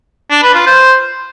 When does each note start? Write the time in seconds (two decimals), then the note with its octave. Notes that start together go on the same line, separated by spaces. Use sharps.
0.31 D4
0.43 B4
0.55 F4
0.67 C5